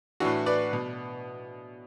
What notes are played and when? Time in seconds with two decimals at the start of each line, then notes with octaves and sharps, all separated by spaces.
0.20 A2 E3 D4 F#4
0.46 B4 D5
0.73 B2